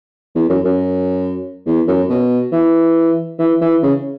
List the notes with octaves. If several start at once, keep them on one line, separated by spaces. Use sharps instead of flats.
E2
F#2
F#2
E2
F#2
B2
E3
E3
E3
C#3